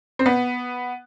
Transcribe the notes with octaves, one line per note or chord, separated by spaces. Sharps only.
C4
B3